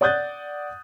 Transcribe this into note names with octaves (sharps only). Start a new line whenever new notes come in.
D5 F#5 D#6 F#6 G6 A6